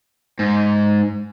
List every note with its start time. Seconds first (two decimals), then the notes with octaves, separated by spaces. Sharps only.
0.39 G#2